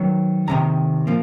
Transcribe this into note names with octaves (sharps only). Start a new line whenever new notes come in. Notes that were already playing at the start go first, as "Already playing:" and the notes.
Already playing: D#3 F#3
F2 C3 D#3 A#5
F3 A#3